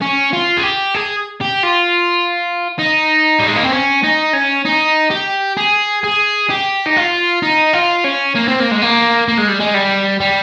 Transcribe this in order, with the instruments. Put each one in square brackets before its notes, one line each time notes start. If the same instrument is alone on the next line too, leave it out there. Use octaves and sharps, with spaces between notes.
[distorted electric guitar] C#4
F4
G#4
G4
G#4
G4
F4
D#4
G3
G#3
A#3
C4
C#4
D#4
C#4
D#4
G4
G#4
G#4
G4
D#4
F4
D#4
F4
C#4
A#3
C4
A#3
G#3
A#3
A#3
G#3
G3
G#3
G3
G3